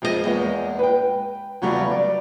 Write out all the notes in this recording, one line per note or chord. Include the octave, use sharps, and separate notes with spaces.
F2 G#3 C4 G4 D#5
E2 G#3 A#3 B3 C#5 D#5
B4 G5
E2 C#3 F#3 G3 A3
D5